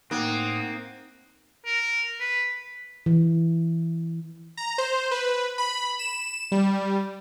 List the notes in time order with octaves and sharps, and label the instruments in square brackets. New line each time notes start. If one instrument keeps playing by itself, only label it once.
[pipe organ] A2 F#5 D#6 [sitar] A#3 [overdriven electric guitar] C4 [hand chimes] D#4 F#6
[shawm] A#4
B4
[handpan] E3
[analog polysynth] A#5
C5
B4
B5
E7
G3